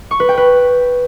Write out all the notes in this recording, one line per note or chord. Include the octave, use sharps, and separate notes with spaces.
C#6
B4
G5
B4